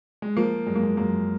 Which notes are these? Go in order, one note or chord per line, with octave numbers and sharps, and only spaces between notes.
G#3
F3 A#3
F#2 G#3
A#3
G#3
F#2 A#3